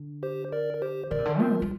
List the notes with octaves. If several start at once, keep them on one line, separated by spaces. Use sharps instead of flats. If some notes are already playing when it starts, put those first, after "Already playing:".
Already playing: D3
G4 C5
A#4 D5
A#4
G4 C5
D3 A#4 D5
C3
D3
C4 F4 A#4
F3
G3 F4